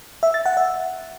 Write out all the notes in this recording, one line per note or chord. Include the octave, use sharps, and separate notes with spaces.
E5
A6
F#5
E5